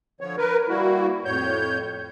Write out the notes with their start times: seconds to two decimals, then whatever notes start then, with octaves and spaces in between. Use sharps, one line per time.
0.21 D3 F3 C#5
0.37 A#4 B4
0.69 G3 A#3 E4 F#4
1.25 F2 A2 C#5 G6